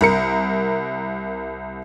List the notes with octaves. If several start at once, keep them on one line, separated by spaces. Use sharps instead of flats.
C2 A#4 C#7